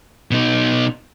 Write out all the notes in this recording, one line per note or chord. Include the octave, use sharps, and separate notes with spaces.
B2 D#4